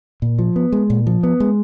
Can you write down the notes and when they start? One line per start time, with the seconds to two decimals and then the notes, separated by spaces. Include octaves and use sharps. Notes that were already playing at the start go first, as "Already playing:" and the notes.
0.22 A#2
0.39 F3
0.56 B3
0.72 G#3
0.90 A#2
1.07 F3
1.23 B3
1.40 G#3